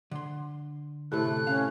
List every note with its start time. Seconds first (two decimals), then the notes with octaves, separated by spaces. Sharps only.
0.11 D3 C6
1.12 A2 C3 A3 F#6
1.47 C#4 F5